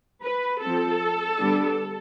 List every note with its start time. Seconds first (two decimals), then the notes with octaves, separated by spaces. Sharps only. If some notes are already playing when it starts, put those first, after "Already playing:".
0.23 B4
0.61 F3 C4 A4
1.39 D3 G3 B3 D4